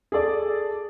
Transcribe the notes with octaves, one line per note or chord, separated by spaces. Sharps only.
G#4 A4 D5